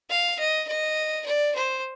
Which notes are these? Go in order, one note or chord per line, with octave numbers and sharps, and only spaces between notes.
F5
D#5
D#5
D5
C5